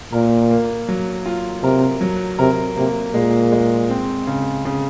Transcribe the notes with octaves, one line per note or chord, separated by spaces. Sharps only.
A#2 A#4
A#3
F#3
F4
C3 A#4
F#3
C3 A#4
C3 A#3
A#2 G#3
G#3
C4
C#3
C#3